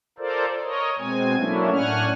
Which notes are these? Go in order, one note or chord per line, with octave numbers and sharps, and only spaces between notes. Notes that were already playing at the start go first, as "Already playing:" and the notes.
F4 A4 A#4 C5 D5
A#4 C#5 D#5
B2 G#3 C4 G#5
F#3 A3 A#3 C#4 D4 E4
A2 C#4 D4 F#5 G#5 F6